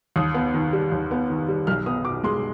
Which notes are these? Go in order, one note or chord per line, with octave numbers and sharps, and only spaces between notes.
D#2 D#6
B3
D#3
G3
D#2
B3
D#3
G3
B1 F6
B3 D#6
B2 D6
G#3 C6